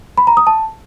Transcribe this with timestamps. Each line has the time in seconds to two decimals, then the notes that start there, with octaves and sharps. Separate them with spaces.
0.18 B5
0.27 A#5
0.37 D#6
0.47 A5